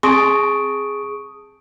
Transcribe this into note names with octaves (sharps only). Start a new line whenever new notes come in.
C4 G#4 A5 C6 C#6 D#6 D7